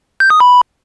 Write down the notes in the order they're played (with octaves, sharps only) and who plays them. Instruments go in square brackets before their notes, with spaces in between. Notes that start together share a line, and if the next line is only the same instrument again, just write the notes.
[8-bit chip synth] G6
D#6
B5